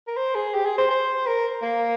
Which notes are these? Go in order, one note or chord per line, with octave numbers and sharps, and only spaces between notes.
A#4
C5
G#4
G4
G#4
C5
C5
A#4
A#3